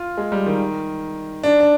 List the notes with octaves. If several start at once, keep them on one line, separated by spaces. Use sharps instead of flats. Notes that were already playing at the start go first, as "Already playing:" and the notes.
Already playing: F4
G#3
G3
D#3
D4
D4